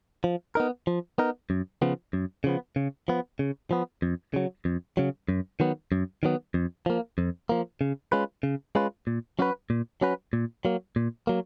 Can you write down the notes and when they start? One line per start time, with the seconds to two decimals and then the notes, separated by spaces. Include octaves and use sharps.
0.24 F3
0.55 B3 D#4 A#4
0.87 F3
1.18 B3 D#4 A#4
1.50 F#2
1.82 C#3 F3 B3
2.13 F#2
2.44 C#3 F3 B3
2.76 C#3
3.08 F3 B3
3.39 C#3
3.71 F3 B3
4.02 F2
4.34 C#3 F#3
4.65 F2
4.97 C#3 F#3
5.29 F#2
5.60 D#3 F#3 B3
5.92 F#2
6.23 D#3 F#3 B3
6.54 F2
6.86 F3 A#3
7.18 F2
7.49 F3 A#3
7.81 C#3
8.12 G#3 C#4 F4 B4
8.43 C#3
8.75 G#3 C#4 F4 B4
9.07 A#2
9.39 F#3 C#4 F#4 B4
9.70 A#2
10.01 F#3 C#4 F#4 B4
10.33 A#2
10.65 F#3 A#3
10.96 A#2
11.27 F#3 A#3